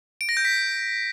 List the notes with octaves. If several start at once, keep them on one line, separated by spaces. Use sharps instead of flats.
D7
A#6
G6
B6